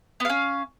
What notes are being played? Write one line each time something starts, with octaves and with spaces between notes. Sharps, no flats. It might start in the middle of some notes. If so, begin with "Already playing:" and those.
B3 C#4 F5